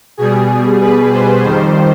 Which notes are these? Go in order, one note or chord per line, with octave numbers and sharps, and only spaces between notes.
B2 G3 G#4
B4
C5
F2 D#3 G3 C5